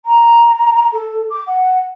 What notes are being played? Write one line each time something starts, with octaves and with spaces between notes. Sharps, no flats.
A#5
A4
D6
F#5